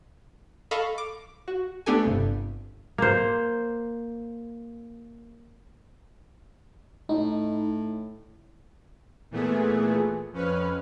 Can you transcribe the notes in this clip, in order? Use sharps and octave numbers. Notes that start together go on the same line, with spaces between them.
A4 D#5 F5 B5 C#6
D6
F#4
A3 B3 D4 G4 A4 G#5
G1 G2 C3
A#3 C5
A2 D#4
A#2 E3 A3 B3 G#4
F2 C#4 B4 F6